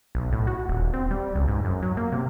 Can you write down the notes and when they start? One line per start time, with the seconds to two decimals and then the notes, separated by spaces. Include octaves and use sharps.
0.15 B1
0.33 A2
0.47 F#4
0.69 D#1
0.94 C4
1.11 G3
1.35 C#2
1.48 G#2
1.65 F#2
1.82 F#3
1.97 A#3
2.12 C3